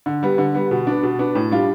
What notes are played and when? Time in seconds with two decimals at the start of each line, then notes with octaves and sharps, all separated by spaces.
0.06 D3
0.23 G3 B3
0.38 D3
0.55 G3 B3
0.71 B2
0.87 B3 D4
1.03 B2
1.19 B3 D4
1.35 A2
1.51 G3 D4 F4